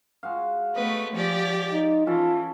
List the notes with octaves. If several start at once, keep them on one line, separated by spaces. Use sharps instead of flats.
G#3 F#4 F5
A3 B3 B4 C#5 D#5
F3 G4 D5
D#4
E3 C#4 F4 A4 A5